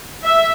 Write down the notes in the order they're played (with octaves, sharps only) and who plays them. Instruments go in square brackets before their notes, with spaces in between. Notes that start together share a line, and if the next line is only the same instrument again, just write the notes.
[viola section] E5